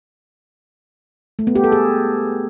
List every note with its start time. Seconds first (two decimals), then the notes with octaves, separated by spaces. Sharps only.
1.39 A3
1.47 B3
1.55 G4
1.64 A4
1.72 G#4